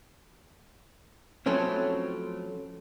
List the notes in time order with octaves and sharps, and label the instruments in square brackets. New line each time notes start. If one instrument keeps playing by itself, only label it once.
[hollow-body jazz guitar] F3 F#3 A3 C4 C#4 E4